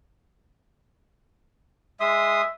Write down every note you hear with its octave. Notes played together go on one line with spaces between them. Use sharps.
G#3 E5 C6 D#6